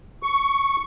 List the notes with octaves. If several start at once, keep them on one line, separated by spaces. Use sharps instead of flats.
C#6